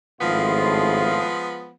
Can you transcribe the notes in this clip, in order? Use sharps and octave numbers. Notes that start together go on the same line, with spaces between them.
G#1 A2 F3 G#3 B3 F4